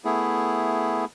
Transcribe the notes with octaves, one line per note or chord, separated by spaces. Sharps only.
A3 B3 E4 G#4